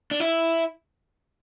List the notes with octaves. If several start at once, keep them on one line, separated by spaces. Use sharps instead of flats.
D4
E4